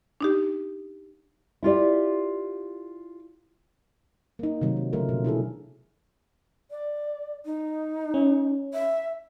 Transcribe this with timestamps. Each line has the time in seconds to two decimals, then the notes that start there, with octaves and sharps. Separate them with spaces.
0.21 D4 D#4 G4
1.63 E4 F4 G4 D5
4.39 A#3 D#4
4.62 C3 D#3 F#3
4.77 C4
4.93 C#3 F3 A3 F4 A#4
5.09 B2
5.24 D4 E4 G#4 A4
6.71 D5
7.45 D#4
8.14 C#4
8.74 E5